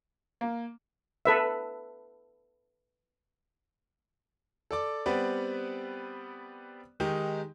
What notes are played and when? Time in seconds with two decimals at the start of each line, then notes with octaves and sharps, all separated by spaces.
0.41 A#3
1.25 A4 B4 E5
4.71 A4 D5 D6
5.06 G3 B3 C4 B4 D5
7.00 D#3 G#3 D#4 G4